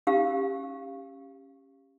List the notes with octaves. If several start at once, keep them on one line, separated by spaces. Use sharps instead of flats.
C#4 G4 F5